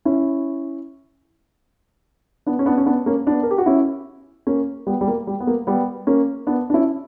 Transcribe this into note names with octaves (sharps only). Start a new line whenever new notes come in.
C#4 E4
B3 D4
C#4
B3 D4
C#4
B3 D4
A#3 C#4
B3 D4
A#4
G4
F#4
C#4 E4
A#3 C#4
G3 B3
G3
A#3
G3
B3
A#3
G3 B3
A#3 C#4
B3 D4
D4
C#4 E4